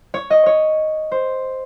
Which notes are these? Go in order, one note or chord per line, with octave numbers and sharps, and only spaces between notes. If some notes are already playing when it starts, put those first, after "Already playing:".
C#5
D#5
C#5
C5